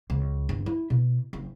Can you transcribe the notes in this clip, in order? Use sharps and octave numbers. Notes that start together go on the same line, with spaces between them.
C#2
G1
E4
B2
F#1